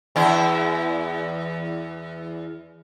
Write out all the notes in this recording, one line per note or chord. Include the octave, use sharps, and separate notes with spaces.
E2 E4